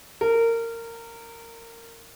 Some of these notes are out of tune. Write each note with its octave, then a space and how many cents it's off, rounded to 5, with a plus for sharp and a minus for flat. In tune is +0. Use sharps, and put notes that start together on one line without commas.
A#4 -20